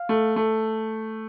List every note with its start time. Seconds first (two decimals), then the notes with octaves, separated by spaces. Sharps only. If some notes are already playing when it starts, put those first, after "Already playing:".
Already playing: F5
0.09 A3
0.36 A3